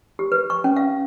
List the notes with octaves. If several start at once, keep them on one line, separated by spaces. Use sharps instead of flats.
G4
B4
C#6
C#4
F5